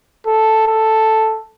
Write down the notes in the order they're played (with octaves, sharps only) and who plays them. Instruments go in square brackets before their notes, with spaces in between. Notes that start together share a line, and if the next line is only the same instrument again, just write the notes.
[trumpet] A4
A4